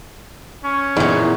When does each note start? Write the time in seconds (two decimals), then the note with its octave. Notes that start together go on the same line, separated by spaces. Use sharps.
0.64 C#4
0.97 E2 A#2 E3 D#4